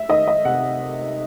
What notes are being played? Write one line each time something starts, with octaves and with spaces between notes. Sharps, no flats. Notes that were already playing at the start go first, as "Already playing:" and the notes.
Already playing: E5
D#3 D#5
D#5
C3 F#5